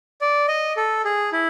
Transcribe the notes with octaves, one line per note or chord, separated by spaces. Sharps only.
D5
D#5
A4
G#4
E4